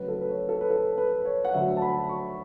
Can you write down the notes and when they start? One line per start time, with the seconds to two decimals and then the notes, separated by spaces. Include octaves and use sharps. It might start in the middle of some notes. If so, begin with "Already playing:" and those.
Already playing: D2 C#3 F#3 B4
0.08 A4
0.21 B4
0.29 C#5
0.49 A4
0.61 B4
0.70 A4
0.98 B4
1.25 C#5
1.45 F#5
1.53 D2 D3 F#3 E5
1.77 A5
1.82 B5
2.09 C#6